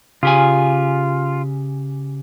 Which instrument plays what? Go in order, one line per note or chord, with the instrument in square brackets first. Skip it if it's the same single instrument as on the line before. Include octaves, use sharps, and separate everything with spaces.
[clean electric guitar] C#3 G4 G#5 [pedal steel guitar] F4